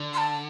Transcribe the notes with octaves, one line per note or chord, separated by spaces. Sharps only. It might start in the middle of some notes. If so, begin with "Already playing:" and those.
Already playing: D3
C6
A5